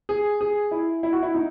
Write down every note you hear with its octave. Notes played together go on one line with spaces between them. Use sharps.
G#4
G#4
E4
E4
F#4
E4
D#4